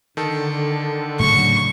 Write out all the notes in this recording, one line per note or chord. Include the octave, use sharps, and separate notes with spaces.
D3 D#3 A4
A2 C#3 F#3 C#6